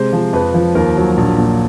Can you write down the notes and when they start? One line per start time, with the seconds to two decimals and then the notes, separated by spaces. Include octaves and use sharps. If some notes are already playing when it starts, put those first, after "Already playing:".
Already playing: C3 G#3 C5
0.13 F3
0.33 F2 B4
0.54 F3
0.75 D#2 A#4
0.97 F#3
1.17 A#1
1.38 A#2